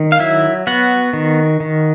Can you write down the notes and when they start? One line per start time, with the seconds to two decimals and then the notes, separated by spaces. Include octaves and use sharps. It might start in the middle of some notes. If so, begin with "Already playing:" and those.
Already playing: D#3
0.12 F5
0.20 F#3 E4 E5
0.67 B3 F#4 F#5
1.13 D#3
1.60 D#3